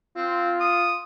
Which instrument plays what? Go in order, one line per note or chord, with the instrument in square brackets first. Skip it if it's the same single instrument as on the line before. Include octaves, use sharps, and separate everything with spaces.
[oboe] C4 [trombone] F4
[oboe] D#6